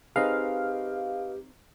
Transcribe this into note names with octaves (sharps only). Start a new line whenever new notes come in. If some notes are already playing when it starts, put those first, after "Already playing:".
C4 D#4 G4 G#4 B4 D#5 F5